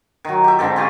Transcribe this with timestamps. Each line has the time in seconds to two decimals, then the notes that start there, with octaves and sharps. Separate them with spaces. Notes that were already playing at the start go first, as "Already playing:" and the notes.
0.25 D#3 F#3
0.44 G4 E5
0.59 G#2 D3 C4 A4
0.76 C4 C#4 F4 G4